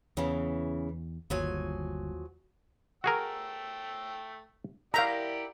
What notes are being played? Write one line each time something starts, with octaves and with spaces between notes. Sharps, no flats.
E2 C#3 E3 B3 C#4
G1 D#2 F3 F#3 G#5
A3 F#4 G#4 A#4 G5 E6
E4 G4 A#4 D5 F5 F#5 A#5 G6